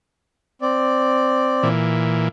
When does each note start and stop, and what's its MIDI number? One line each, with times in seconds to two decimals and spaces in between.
0.62 1.68 60
0.62 1.68 74
1.63 2.28 46
1.63 2.28 52